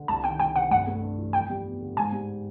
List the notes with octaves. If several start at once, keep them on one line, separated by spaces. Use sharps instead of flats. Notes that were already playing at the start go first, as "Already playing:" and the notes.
Already playing: D3
C2 A5
D#3 G5
C2 G5
C3 F#5
G2 F#5
A3
D4
E3
F2 G5
G3
B3
D3
G#2 G#5
G3